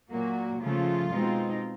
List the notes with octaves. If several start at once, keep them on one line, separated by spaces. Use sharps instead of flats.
A#2 F#3 A#3 F#4
C#3 F3 A3 F4
B2 G#3 C4 D#4